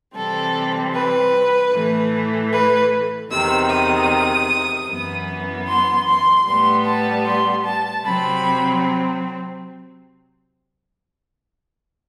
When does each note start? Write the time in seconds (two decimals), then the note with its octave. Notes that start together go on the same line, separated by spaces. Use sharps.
0.15 C3 E3 G3 C4 A4
0.94 B4
1.73 A2 E3 A3
2.52 B4
3.31 E2 C3 D#3 E6
3.70 D#6
4.89 F#2 E3 B3
5.68 C6
6.07 C6
6.47 A2 G3 B3 C6
6.86 A5
7.26 C6
7.65 A5
8.05 C3 F#3 C4 B5